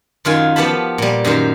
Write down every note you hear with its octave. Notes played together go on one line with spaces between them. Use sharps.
F#2 D#3 F4 G#5
F3 B3 G4 F5 A5 B5
A#2 G3
F#2 D#3 G4 C5